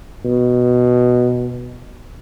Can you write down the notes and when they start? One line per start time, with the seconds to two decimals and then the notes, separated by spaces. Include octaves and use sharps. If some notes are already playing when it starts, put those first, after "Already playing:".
0.25 B2